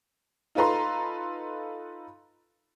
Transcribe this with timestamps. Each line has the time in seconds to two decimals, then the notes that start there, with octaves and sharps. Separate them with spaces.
0.55 D#4 F4 A4 B4 A#5 C6